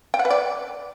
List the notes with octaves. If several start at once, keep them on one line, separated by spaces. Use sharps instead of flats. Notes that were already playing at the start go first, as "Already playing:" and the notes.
G5
F#5
B4
D5